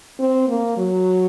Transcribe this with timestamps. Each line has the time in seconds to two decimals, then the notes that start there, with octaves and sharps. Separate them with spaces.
0.19 C4
0.48 A#3
0.77 F#3